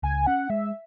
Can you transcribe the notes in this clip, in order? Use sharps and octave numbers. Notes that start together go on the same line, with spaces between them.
C#2 G#5
C#4 F#5
G#3 E5